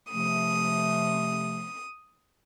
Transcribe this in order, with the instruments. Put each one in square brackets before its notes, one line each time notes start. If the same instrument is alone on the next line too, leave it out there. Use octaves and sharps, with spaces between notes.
[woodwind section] C3 F3 A3 [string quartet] D#6